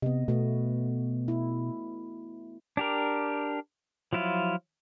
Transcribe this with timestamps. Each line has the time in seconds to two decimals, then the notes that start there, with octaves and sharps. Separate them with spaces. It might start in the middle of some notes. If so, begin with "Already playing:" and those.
0.02 C3 B3 D#5
0.28 B2 A3 B3 F#4
1.28 E4
2.77 D4 G4 A#4
4.13 F3 F#3 E4 F4